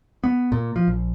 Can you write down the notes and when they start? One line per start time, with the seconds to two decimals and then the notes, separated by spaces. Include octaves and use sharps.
0.24 B3
0.52 A#2
0.76 F3
0.88 A#1